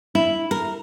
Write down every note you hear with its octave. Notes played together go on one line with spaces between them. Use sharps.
E4
A#4